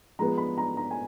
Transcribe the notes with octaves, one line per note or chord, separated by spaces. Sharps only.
F3 G#3 B3 A#5
B5
A#5
A#5
G#5